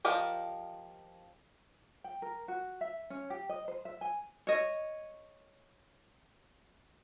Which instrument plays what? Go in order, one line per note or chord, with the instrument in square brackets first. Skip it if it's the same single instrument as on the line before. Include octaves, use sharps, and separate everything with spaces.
[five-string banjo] F3 G4 A#4 D5 D#5
[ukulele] G5
A#4
F#4
E5
C#4
G4
D#5
C5
E5
G#5
C#5 D#5